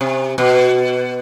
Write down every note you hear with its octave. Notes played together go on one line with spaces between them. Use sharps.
C3
B2